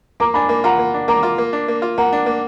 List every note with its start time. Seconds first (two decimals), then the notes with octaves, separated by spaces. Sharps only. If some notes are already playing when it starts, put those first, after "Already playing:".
0.20 A#3 A#5 D6
0.34 D4 G#5 B5
0.49 A#3
0.64 F4 F#5 A#5
0.79 A#3
0.94 D4
1.08 A#3 A#5 D6
1.23 F4
1.38 A#3
1.53 D4
1.68 A#3
1.82 F4
1.97 A#3 F#5 A#5
2.13 D4
2.26 A#3